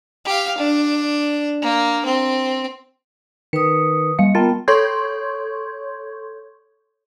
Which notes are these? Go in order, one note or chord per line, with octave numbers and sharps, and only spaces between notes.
G4 F5
D4
A#3
C4
D#3 B4 D#6 C#7
G3 F5 C#7
B3 F4 A#4 G5 A5 A6
A4 C#5 C6 C#6 G6 G#6